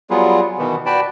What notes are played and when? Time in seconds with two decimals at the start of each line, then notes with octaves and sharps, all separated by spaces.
0.10 F#3 G3 B3 F4 G#4
0.58 B2 D#3 E3 B3
0.86 F#4 B4 D5 G5 A5 B5